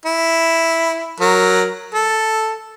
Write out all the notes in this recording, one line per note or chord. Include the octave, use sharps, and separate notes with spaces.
E4
F#3 A#4
A4